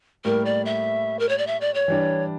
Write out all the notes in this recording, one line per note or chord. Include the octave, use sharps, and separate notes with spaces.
A2 G3 A#3 A#4
D5
E5
A#4
C#5
D5
E5
D5
C#5
E3 G3 D4